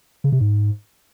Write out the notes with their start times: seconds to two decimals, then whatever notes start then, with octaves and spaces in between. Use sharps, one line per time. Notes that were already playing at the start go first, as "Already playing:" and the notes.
0.24 C#3
0.32 C3
0.41 G#2